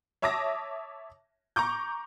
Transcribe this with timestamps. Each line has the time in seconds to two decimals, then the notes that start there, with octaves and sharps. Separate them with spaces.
0.22 C#5 E5 A5 D6 D#6 A#6
1.56 A#5 C#6 D6 G6